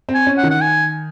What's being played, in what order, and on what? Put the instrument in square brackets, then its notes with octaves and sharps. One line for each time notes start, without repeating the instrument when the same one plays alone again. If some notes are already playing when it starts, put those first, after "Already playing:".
[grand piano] C4
[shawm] G#5
[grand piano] C#4
[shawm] F#5
[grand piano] D#3
[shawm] F#5
G#5